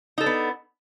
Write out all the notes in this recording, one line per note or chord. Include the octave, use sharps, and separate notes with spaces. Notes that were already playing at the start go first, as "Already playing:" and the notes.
B3 D4 D#4 A4